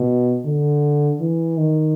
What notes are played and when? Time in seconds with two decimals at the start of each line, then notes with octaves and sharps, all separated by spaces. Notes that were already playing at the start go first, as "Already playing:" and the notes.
Already playing: B2
0.45 D3
1.20 E3
1.57 D#3